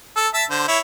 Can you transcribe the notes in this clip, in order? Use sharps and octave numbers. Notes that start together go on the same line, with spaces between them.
A4
E5 A5 E6
D3 C5
E4 C#5